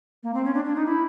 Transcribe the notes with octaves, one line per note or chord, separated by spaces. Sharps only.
A#3
C4
C#4
D4
D4
D#4
E4